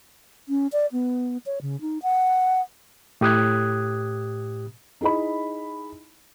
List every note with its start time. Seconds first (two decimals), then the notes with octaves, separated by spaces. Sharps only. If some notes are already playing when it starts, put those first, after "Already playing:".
0.49 C#4
0.72 D5
0.92 B3
1.46 C#5
1.62 C#3
1.81 D#4
2.03 F#5
3.21 A2 G4 D#6 F#6 G#6
5.01 D#4 E4 G#4 D#5 B5